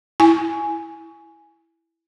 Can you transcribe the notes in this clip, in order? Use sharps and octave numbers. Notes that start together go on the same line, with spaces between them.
E4 G#5